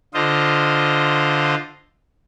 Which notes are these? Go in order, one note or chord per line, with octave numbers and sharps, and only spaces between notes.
D3 F4 C5 D#5